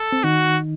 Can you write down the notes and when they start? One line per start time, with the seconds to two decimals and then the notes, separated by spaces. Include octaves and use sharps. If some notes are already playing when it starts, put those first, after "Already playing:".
Already playing: A4
0.12 C4
0.24 D#3 D#4 F#4